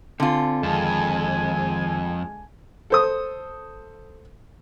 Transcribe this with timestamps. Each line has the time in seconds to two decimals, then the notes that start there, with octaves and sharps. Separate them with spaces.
0.20 D3 C4 F4 G#5
0.63 F2 D#3 G#3 G#5 A5
2.90 A4 C5 D#6